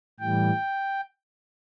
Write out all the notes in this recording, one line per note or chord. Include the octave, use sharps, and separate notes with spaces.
A2 E3 G3 G5